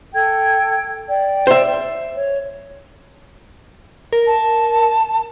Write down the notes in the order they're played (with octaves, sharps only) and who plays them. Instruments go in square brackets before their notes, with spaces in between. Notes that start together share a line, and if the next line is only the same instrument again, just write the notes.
[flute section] A4 G5 G#6
D5 G5
[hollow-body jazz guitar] C5 E5
[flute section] C#5
[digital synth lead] A#4
[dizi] A5